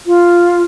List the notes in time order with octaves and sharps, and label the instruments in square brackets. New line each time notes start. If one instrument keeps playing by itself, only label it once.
[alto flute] F4